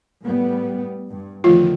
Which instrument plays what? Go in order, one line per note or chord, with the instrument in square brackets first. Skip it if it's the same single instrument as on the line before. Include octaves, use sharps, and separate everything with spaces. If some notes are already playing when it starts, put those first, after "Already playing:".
[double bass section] A2 G3 B3
G2
[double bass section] E2 D3 D#3 [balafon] F3 A3 F4